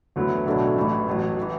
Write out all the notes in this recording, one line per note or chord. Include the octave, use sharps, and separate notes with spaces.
D2 D3 F#3 B3 E4
B1 A2 F#3 A3 D4
A1 A2 E3
A1 A2 F#3
E3